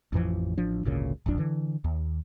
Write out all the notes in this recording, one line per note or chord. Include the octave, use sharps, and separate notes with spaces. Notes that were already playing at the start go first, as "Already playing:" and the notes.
A1 F2 E3 F3
A1 F3 D4
G#1 D2 A#2 C#3
D1 G#1 F2 D4
D3 E3
D#2